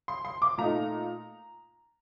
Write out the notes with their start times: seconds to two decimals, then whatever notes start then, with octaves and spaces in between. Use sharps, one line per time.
0.08 C6
0.25 C6
0.42 D6
0.58 A#2 A3 D#4 A#5